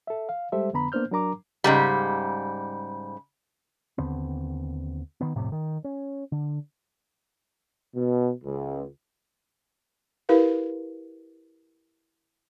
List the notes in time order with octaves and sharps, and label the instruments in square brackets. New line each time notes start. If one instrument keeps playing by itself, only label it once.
[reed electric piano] A4 E5
F5
G3 G#3 G4 A4 C5 E5
F2 D3 B3 A#5 B5
A#3 B3 D4 C5 F6 G6
F#3 D4 A#4 A#5 D6
[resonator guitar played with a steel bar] G#2 C#3 G3
[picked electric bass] D#2 D3 B3 C4
D#3 B3
G1 F2 A2 C3
D#3
C#4
D3
[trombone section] B2
C#2
[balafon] E4 G4 A#4 B4 F5